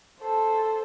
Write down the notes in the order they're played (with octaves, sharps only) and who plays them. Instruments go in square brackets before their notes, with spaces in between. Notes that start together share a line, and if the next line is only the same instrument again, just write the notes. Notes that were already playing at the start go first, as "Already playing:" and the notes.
[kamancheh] A4 C5